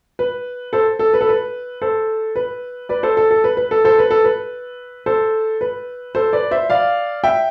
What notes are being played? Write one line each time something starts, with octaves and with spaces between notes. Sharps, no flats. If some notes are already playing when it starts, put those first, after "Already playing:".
B4
A4 C5
A4
B4
A4
B4
A4 C5
B4
B4 D5
A4 C5
A4
A4
B4
B4
A4
A4 C5
B4
A4
B4
A4 C5
B4
A4 C5
B4 D5
C5 E5
D5 F5
E5 G5